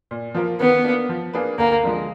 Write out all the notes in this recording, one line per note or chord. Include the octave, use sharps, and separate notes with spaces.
A#2
F3 A#3 F4 A#4
D#3 B3
A#3 D4
F3
A#3 D4 G#4 B4
D2 A#3
D3 F3 G#3